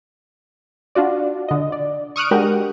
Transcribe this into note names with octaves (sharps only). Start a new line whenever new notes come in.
D4 F4 F#4 D5
D3 D#5
D5
C#6 D#6 F6 F#6 D7
G#3 D4 F#4 G4 A#4